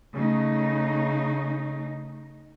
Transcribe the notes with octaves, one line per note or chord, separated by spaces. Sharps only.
C#3 A3 D#4